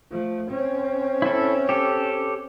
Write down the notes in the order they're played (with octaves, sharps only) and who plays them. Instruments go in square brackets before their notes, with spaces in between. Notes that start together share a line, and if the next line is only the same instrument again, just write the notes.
[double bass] F3 A3
C4 C#4
[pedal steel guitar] E4 A4
G4 A4